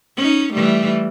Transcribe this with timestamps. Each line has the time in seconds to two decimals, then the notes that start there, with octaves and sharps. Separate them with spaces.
0.17 C#4 D#4
0.53 E3 G3 A3